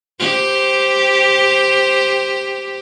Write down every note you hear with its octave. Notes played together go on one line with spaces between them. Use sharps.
G4 C5